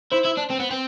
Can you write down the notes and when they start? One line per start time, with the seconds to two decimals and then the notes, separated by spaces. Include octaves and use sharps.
0.12 E4 C5
0.25 E4
0.37 D4
0.50 C4
0.60 B3
0.71 C4